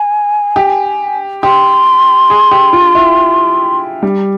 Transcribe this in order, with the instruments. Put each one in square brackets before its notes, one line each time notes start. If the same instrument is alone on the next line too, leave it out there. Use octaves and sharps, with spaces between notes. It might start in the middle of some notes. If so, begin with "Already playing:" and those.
Already playing: [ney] G#5
[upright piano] G4
[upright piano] G4 [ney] C6
[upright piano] G#4
G4
F4
E4
G3